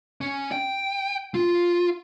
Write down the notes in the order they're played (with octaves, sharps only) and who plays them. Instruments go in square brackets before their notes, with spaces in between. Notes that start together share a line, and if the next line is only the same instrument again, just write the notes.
[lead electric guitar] C#4
G5
F4